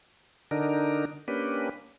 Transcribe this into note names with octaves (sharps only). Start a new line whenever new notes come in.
D3 D4 D#4 A#4
A#3 C#4 D4 G4 B4